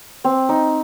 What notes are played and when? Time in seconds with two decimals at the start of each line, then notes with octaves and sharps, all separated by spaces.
0.24 C4
0.49 D#4